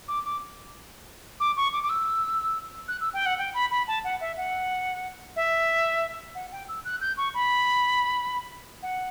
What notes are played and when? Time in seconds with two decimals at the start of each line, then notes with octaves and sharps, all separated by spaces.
0.08 D6
0.25 D6
1.40 D6
1.57 C#6
1.73 D6
1.83 D6
1.89 E6
2.88 F#6
3.00 E6
3.13 G5
3.26 F#5
3.38 G5
3.54 B5
3.71 B5
3.87 A5
4.04 F#5
4.21 E5
4.37 F#5
5.36 E5
6.35 F#5
6.52 G5
6.68 E6
6.85 F#6
7.01 G6
7.17 C#6
7.34 B5
8.82 F#5